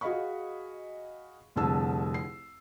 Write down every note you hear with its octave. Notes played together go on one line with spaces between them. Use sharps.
F#4 G#4 D#5 F5 B5 C#6
F1 C2 D3 G#4 A5 E6
C7